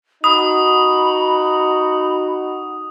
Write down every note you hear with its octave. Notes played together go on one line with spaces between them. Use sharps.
D#4 F#4 B5 D#6